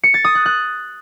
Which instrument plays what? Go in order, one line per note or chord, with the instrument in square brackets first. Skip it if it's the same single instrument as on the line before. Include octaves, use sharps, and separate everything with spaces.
[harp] C#7
A6
D#6
F#6
F#6